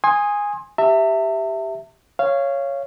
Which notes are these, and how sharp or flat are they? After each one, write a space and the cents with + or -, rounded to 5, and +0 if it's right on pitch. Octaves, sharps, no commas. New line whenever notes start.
G#5 -10 C6 +25 D#6 +0
G4 +0 E5 +0 A5 +45
C#5 +0 F5 -20